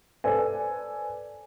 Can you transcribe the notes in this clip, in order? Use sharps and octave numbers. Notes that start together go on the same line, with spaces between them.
A4 B4 C5 D5 G#5